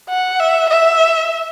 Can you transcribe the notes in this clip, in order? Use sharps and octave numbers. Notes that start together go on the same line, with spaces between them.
F#5
E5
E5